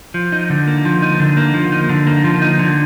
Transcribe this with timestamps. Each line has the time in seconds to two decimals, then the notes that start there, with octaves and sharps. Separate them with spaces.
0.14 F3
0.32 D#4
0.50 D3
0.67 A#3
0.85 F3
1.02 D#4
1.20 D3
1.37 A#3
1.54 F3
1.72 D#4
1.89 D3
2.07 A#3
2.24 F3
2.42 D#4
2.59 D3